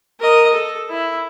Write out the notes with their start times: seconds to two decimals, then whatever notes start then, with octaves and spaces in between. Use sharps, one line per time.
0.20 A#4 D#5
0.53 A4
0.89 E4